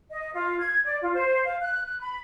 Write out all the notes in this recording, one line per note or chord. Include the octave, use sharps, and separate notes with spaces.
D#5
F4
G#6
D5
F4
C5
F5
F#6
F#6
B5